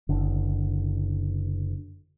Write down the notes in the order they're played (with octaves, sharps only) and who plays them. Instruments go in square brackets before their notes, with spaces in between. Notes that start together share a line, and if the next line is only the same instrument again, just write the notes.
[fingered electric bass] F#1 D3